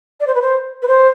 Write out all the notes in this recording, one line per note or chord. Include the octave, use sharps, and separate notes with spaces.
D5
C5
B4
C5
B4
C5